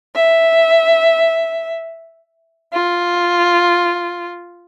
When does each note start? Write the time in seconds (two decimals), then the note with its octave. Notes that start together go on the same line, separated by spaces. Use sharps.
0.15 E5
2.73 F4